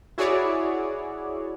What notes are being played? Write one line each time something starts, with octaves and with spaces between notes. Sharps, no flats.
E4 F#4 G#4 C#5 D5